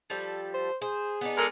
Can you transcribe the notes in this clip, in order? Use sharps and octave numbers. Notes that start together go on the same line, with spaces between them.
F3 G3 A4
C5
G#4 C5
B3 D4 D#4
G#3 A4 A#4